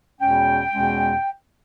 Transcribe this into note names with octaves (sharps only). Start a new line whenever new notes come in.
E2 B2 G#3 C#4 G5
E2 B2 G#3 C#4